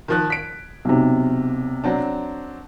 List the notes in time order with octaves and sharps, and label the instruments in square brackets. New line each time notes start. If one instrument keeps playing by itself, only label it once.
[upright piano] D#3 F3 F#6
B6 D7
[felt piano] B1 C3
[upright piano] F#3 C4 D4